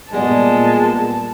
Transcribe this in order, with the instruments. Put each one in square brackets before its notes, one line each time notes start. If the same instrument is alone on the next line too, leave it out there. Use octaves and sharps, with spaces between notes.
[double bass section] A#2 [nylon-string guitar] G3 B3 D5 [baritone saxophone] G#3 [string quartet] A5